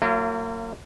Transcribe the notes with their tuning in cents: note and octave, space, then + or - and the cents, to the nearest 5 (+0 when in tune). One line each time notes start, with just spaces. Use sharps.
F#3 +0 A#3 -35 E4 +45